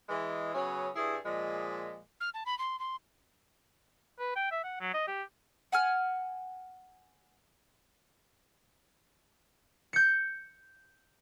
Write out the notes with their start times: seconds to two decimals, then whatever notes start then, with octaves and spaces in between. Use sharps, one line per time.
0.09 E3 G#3
0.54 C#3 F#3 B3 C#4
0.96 G2 E4 G#4
1.25 A#2 F3 G#3
2.20 F6
2.34 A5
2.46 B5
2.59 C6
2.79 C6
4.19 B4
4.36 G5
4.51 E5
4.64 F#5
4.80 F#3
4.94 D#5
5.08 G4
5.72 F#5 G#5 F6
9.93 G6 C#7